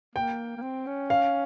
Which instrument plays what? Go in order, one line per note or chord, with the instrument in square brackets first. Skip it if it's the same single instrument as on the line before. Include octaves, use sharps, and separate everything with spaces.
[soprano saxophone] A#3 [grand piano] G5
[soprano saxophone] A#3
C4
C#4
[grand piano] F5